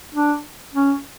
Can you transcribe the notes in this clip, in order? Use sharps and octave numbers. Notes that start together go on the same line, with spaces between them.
D4
C#4